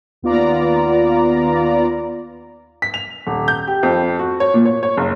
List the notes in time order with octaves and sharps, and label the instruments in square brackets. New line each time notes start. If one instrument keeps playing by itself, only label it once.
[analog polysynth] D#2 B3 F4 D5 A#5
[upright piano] B6
F7
D#1
G6
G4
F2
F#4
C#5
A#2
C#5
C#5
F#1